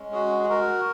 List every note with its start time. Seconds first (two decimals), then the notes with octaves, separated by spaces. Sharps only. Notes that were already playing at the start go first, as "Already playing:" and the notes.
Already playing: G#3 C#4
0.12 F#4 G#4
0.44 G#4
0.50 F#4 A#4